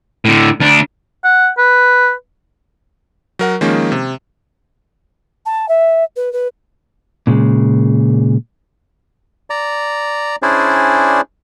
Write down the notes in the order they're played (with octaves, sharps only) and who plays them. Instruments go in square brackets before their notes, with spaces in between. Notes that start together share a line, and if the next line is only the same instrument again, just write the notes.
[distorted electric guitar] A2 D3
D2 D4
[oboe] F#5
B4
[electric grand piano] F#3 A#4 F#5
D#3 F3 G#3 A#3 C#4
C3
[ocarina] A5
E5
B4
B4
[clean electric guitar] A#2 C#3 G#3
[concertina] D5 A#5
C#4 D4 E4 G#4 C5 D5